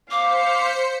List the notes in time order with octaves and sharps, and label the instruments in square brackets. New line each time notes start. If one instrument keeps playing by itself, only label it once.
[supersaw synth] C5 B6 C#7 [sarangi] F5 [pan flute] D6